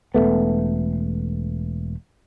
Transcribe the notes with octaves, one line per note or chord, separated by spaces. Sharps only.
E1 D#2 A3 B3